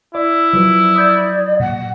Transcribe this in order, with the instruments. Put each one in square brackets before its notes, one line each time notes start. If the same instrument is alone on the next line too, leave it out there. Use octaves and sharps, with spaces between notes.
[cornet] E4 [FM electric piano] D5
[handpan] F3 F#3 B4
[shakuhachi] D5 [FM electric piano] D#6 G6 G#6
[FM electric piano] A#2 [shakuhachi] F#5